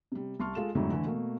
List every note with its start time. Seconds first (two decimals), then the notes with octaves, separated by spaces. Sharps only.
0.12 C3 G3
0.40 C2 A5 C6 C#6 F6
0.55 G#3 F4 A4 E7
0.75 F2 G#2 D3 F#3 A3 E4
0.92 D3 E3 A3
1.05 B2 A3 A#3